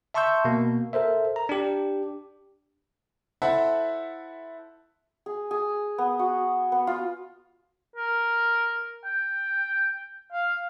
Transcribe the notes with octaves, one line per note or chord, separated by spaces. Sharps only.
E5 A5 C6 C#6 E6 G6
B2 A#3
A4 A#4 C5 E5
A#5
D4 G4
E4 A4 C5 E5 F#5
G#4
G#4
B3
F#4
B3
F4
A#4
G5
F5